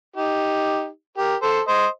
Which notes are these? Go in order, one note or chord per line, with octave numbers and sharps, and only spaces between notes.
D#4 G4
G4 A#4
A4 C5
C5 D#5